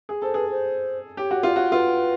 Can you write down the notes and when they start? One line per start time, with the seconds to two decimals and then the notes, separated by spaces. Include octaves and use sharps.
0.09 G#4
0.22 A4 C5
0.34 G#4 B4
0.50 C5
1.17 G4 C#5
1.31 F#4 C#5
1.43 F4 D5
1.54 F#4 C#5
1.71 F4 B4